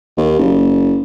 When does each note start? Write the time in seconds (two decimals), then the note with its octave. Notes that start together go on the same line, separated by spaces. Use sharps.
0.17 D#2
0.39 F#1